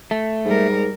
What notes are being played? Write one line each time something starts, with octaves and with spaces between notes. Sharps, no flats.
A3
G#2 G3 A#4